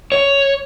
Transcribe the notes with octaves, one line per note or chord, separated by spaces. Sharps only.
C#5